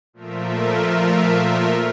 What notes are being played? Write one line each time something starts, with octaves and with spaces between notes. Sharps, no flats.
A#2 F3 A3 F4 A#4 E5